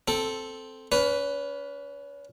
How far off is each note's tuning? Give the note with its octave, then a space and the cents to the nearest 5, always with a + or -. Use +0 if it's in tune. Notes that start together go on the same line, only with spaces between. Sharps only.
C4 +0 A4 +0
C#4 +35 B4 +0